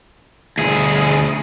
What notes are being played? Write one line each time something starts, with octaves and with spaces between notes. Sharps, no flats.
D2 G#4